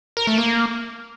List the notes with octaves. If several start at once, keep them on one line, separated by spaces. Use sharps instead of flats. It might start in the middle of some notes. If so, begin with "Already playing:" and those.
A#4
A3
A#3